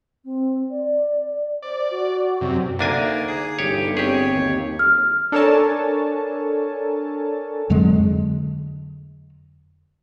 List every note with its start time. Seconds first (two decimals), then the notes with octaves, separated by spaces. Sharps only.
0.24 C4
0.70 D5
1.63 C5 D5
1.90 F#4
2.41 F#2 C3
2.79 D2 A#3 D4 D#4 G#5
3.28 G#4
3.59 G1 G4 C#5
3.97 C4 G4 G#4 C#5
4.33 D#2
4.79 F6
5.32 D4 A4 A#4 C#5 G#5 A5
7.70 F2 D3 F#3 G#3